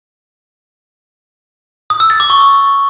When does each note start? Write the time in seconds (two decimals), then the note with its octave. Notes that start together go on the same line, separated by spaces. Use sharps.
1.90 D#6
2.00 E6
2.10 A6
2.20 D6
2.30 C#6